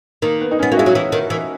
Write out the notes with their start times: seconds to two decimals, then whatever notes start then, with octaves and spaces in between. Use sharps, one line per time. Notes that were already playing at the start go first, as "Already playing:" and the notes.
0.22 D#3 A#3
0.41 B3
0.51 D#4
0.59 B3 C#4
0.72 A#3 F#4
0.77 G#3 E4
0.86 F#3
0.95 E3
1.12 D#3
1.30 E3